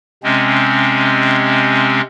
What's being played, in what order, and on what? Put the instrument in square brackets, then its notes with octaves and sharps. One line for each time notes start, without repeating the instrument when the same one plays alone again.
[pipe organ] C3 G#3 C4 C#4